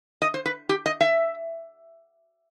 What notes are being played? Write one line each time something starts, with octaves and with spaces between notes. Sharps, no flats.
D#5
C5
B4
G4
D#5
E5